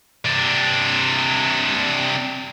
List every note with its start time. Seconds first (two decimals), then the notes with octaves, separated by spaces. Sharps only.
0.25 C3 D4